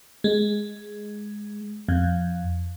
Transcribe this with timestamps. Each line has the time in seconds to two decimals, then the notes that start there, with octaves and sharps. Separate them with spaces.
0.24 G#3
1.89 F2